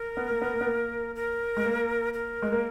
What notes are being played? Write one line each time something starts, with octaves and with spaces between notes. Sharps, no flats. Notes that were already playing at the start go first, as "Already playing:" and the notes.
Already playing: A#4
B3
A#3
B3
A#3
B3
A#3
A#4
G#3
A#3
A#4
G#3
A#3